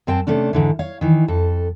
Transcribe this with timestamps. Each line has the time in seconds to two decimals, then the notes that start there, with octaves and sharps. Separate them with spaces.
0.07 F#2 C4 G5 A5
0.27 C3 A3 C#4 D4
0.53 G#2 D3 E3
0.79 C#5 F5
1.01 D#3 E3
1.28 F2 A4